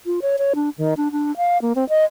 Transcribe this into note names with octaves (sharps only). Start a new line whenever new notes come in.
F4
C#5
C#5
D4
D#3
D4
D4
F5
A#3
C4
D#5